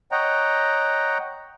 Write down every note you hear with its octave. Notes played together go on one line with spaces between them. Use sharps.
C#5 D#5 F#5 G5 A#5